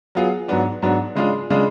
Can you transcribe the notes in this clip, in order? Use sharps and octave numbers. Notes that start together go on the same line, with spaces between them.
F#3 B3 F4 G#4
G#2 F#3 B3 D4
G#2 F#3 B3 D4
C#3 G#3 D4 F4 G#4
C#3 G#3 D4 F4 G#4